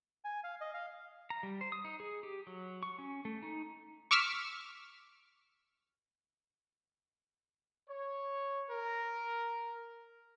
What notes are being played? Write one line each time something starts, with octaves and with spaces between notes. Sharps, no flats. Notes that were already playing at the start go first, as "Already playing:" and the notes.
G#5
F5
D#5
F5
A#5
G3
C5
D#6
D#4
G#4
G4
F#3
C#6
C#4
A3
D#4
C#6 D6 E6 F6 B6
C#5
A#4